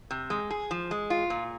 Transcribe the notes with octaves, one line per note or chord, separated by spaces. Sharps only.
C3
G#3
G#4
F3
G#3
F4
A#2